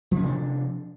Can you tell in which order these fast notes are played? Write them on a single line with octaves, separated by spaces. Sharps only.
F3 C#4 C3 D4